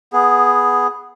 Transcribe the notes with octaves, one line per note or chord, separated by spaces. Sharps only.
B3 G#4